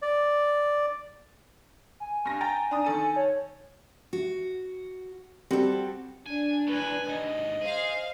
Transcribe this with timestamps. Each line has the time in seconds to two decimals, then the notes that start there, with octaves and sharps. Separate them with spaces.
0.02 D5
2.00 G#5
2.25 G2 A#6
2.41 G5 A#5 A6
2.71 D4 A#5 D#6
2.85 D#3 A4 D#7
3.16 C#5
4.13 F#4
5.51 G3 C4 F#4 A4
6.27 D4 G#5
6.67 C#2 A2 B4 G#5
7.09 D#2 G#2 D#5
7.61 G#4 C5 F5